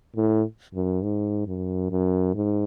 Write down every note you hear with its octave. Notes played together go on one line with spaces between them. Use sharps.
A2
F#2
G#2
F#2
F#2
G#2